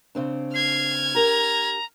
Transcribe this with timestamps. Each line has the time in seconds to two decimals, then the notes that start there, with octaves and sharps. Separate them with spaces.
0.15 C#3 C4 D4
0.54 F6 G#6 C7
1.15 G4 A#4 A#5